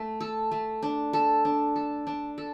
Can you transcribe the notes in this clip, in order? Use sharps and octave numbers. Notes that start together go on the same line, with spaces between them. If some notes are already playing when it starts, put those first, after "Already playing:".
Already playing: A3
A4
A3
D4
A4
D4
A4
D4
A4